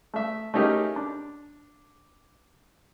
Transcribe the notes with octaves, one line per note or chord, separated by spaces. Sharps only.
A3 E5
A3 C#4 D#4 G4 G#4 A#4
D4